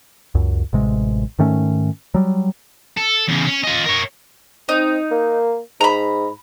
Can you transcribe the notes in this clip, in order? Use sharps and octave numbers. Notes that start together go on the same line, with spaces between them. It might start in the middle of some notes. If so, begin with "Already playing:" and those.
C#2 F#2
A1 C3 G#3
G#2 D#3 A3 C#4
F#3 G3
A4
E2 C#3
C#4
F4 D#5
A#4 C#5
C4 D#4
A#3
G#2 A#5 B5